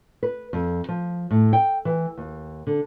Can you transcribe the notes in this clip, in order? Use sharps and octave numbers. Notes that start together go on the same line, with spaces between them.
B4
F2
F3
A2
G5
E3
D#2
D3